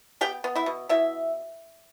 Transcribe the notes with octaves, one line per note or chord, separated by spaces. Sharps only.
B3 G4 G5
B3
E4 E5
B2
B2 E4 E5